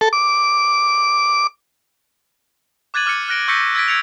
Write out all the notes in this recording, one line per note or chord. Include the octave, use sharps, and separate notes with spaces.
A4
D6
D6 F#6 G#6 A6 D#7 F#7
D6 F6 A6 C#7
F6 F#6 A#6 D7 G7
C#6 E6 G6 A#6 B6 C#7
E6 G#6 A6 B6 D7
E6 G#6 C#7 D7 F7